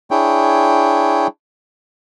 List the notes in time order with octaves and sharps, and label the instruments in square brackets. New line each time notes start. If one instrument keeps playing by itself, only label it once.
[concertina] D4 E4 G#4 C#5 G5